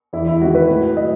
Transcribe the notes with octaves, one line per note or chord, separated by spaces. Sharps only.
E2 E4
E4
D#3 G#3 F#4
B4
A2
F#3 D#5